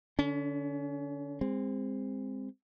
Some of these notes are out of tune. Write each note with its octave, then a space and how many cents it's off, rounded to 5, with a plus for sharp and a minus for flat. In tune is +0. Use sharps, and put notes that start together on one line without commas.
D3 +0 C#4 +35
G#3 -35 C4 +0